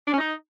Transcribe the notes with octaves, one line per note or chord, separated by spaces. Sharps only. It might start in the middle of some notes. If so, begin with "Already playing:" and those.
D4
C#4
D#4